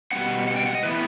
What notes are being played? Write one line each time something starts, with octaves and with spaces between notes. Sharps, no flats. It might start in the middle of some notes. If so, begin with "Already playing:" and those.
B2 G3 C4 F#5
F#5
G5
F#5
D#5
A2 E3 B3 B4